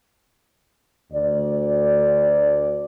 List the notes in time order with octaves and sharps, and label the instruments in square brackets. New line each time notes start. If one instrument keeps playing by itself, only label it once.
[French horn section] D2 D5